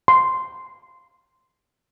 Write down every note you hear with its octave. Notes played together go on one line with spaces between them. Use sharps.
C6